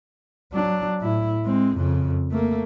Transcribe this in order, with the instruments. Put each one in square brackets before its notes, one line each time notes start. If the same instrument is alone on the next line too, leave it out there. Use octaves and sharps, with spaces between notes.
[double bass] F#3 D4
A2 E4
G#3 C4
F2 C#3
A3 A#3